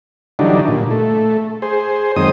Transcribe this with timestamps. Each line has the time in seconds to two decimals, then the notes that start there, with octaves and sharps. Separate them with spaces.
0.39 D3 E3 F#3 G3 D4 D#4
0.68 A#2
0.91 A3
1.62 G#4 C5
2.16 F#2 D#3 G#3 C4 C5 D#6